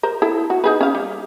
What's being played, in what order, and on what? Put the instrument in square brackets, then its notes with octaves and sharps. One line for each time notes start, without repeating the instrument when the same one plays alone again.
[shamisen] A#4 C5
E4 A4
F#4
D#4 G#4 B4
C#4 F5
G3